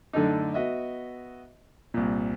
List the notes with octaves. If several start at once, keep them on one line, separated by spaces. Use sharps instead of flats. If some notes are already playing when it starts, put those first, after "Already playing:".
F#2 D3 A3 D4 D#4
B3 F#4 D#5 E5
C2 A#2